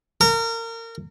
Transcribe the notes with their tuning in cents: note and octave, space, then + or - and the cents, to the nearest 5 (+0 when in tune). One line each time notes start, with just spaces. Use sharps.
A#4 -30